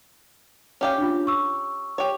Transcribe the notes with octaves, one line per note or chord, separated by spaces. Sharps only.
C#4 G4 F5
D4 F4
C#6 E6
G4 C#5